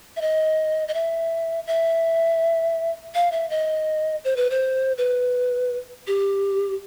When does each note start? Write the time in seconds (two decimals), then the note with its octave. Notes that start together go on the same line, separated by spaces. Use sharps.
0.16 E5
0.21 D#5
0.88 D#5
0.94 E5
1.67 E5
3.15 F5
3.32 E5
3.50 D#5
4.25 C5
4.36 B4
4.50 C5
4.98 B4
6.07 G4